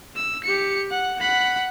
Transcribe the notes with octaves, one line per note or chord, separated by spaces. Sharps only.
E6
G4 C#7
F#5
F#5 B5